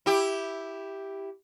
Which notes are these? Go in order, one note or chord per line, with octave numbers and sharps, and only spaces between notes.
E4 G4